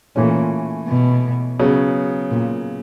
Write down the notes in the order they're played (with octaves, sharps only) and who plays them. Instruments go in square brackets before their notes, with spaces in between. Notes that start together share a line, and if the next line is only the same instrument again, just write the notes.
[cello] A#2 [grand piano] E3 A3 C#4
[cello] B2
[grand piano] C#3 F#3 B3
[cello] A#2